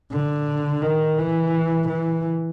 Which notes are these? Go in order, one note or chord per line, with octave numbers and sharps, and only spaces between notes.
D3
D#3
E3
E3